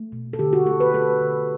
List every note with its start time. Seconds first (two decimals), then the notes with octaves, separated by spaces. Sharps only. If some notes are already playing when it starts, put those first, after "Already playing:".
Already playing: A3
0.12 B2
0.33 A4
0.39 D3 G4
0.53 F#4
0.66 A3 A4
0.80 B4
0.94 A3 A4
1.21 D3